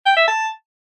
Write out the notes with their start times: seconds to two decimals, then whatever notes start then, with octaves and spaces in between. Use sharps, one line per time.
0.06 G5
0.17 E5
0.28 A5